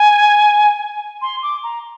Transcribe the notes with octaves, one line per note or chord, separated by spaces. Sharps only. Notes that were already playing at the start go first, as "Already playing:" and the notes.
Already playing: G#5
C6
D6
A#5